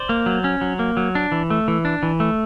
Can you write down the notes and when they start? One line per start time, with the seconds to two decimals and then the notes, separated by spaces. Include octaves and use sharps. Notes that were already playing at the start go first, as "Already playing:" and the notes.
Already playing: C5 D5
0.09 A#3
0.26 F#3
0.44 C#4
0.61 F#3
0.79 A#3
0.97 F#3
1.15 D4
1.32 E3
1.50 A3
1.68 E3
1.85 D4
2.03 E3
2.20 A3